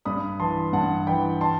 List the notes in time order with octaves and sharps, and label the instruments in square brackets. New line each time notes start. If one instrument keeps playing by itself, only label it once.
[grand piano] G2 B5 D#6
E3 A5 C6
G2 F#5 A5
E3 G5 B5
A5 C6